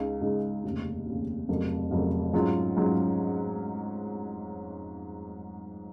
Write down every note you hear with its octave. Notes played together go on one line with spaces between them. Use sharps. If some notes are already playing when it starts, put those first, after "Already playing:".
Already playing: C#2 C#3 G#3 D#4
C#2 C#3 G#3 D#4
F1 D#2 C#3
F1 D#2 C#3
F1 F2 C#3 F#3 A#3
F1 F2 C#3 F#3 A#3
G#2 F#3 C#4 F4
G#2 F#3 C#4 F4